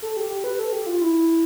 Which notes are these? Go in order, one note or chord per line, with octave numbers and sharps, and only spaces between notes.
A4
G4
G4
B4
A4
G4
F4
E4